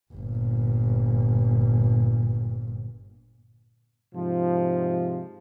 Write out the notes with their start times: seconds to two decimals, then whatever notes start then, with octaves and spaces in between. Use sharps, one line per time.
0.14 G1 A#2
4.14 G#2 C3 F3